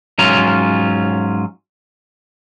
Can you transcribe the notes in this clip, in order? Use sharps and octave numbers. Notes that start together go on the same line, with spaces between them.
G#2 F#3 C#4 F4 A#5